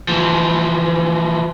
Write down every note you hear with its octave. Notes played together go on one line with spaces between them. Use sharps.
E3 F3